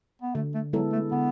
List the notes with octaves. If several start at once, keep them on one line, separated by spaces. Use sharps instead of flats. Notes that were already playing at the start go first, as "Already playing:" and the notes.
B3
D3 A3
A3
F#3 G#3 B3 E4 A4
A3
D3 B3